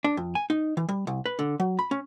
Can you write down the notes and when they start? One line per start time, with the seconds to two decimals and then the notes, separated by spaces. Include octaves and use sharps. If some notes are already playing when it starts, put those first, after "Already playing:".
0.04 D4
0.17 F2
0.35 G#5
0.50 D#4
0.77 E3
0.89 G3
1.07 C2
1.26 B4
1.39 D3
1.60 F#3
1.79 B5
1.91 C#4